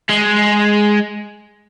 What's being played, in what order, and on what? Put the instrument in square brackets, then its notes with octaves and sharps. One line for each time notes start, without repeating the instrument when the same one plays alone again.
[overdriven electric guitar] G#3